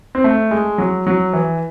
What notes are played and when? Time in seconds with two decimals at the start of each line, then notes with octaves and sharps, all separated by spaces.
0.15 C4
0.24 A3
0.51 G#3
0.78 F#3
1.07 F#3
1.33 E3